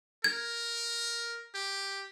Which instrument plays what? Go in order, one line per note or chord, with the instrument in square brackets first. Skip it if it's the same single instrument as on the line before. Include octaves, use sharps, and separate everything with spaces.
[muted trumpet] A#4 [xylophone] G#6
[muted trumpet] G4